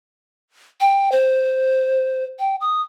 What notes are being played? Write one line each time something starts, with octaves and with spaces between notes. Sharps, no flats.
G5
C5
G5
D#6